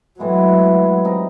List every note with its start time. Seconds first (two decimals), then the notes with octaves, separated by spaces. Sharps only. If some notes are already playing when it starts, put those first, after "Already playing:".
0.19 A2 E3 F#3 G#3 B3
1.05 G3 C4 D#4